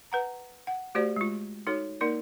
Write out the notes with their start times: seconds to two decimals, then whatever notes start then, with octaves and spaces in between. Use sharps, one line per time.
0.12 B4 F#5 A#5
0.67 F#5
0.95 A3 F#4 G4 C5 D5
1.16 G#3 F4
1.67 D#4 F#4 A4 C#5
2.01 A#3 D#4 A#4 D5